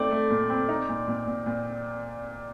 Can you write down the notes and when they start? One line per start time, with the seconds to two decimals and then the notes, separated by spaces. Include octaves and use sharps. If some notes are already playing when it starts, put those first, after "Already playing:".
Already playing: A3 C4 D#4 D5
0.11 A3
0.30 A#2
0.50 C4
0.69 D#4
0.89 A#2
1.08 A#2
1.26 A#2
1.46 A#2